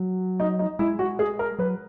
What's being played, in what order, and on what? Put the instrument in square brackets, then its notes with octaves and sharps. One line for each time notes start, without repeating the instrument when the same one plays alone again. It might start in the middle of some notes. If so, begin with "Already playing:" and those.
Already playing: [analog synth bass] F#3
[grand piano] D#4
D#4
[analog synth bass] G#3 [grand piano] E4
[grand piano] F#4
G#4
A#4
[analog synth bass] F#3 [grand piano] B4